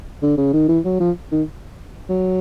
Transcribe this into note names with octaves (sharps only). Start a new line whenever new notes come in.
D3
C#3
D#3
E3
F#3
F3
D#3
F#3